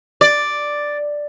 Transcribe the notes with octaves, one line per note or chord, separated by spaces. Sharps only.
D5